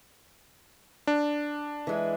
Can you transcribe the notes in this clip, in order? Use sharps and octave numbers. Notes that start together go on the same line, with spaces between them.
D4
E3 G#3